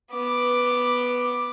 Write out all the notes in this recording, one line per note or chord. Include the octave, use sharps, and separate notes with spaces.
B3 D6